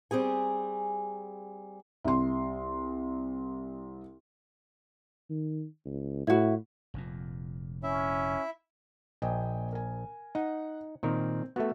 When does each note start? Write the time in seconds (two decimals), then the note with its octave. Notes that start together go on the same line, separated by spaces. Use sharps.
0.11 G3 C4 G#4 G#5
2.04 C2 C6
5.30 D#3
5.86 C#2
6.27 A2 E4 F#4
6.94 F1 F2 A#2
7.83 C#4 E4 E5
9.22 A#1 D#5 G5 G#5
9.73 A#4 G#5
10.35 D#4 F#5
11.03 A#2 D#3 C4 A#4
11.56 A3 B3 F#4 A4 E5